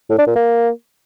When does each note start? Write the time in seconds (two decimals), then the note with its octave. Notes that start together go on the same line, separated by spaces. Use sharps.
0.10 A2
0.18 D4
0.27 A#2
0.36 A#3